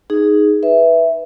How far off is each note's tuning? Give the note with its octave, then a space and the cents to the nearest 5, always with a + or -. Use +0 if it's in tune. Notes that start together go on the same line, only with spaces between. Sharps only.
D#4 +0 G#4 +0
B4 +0 E5 +0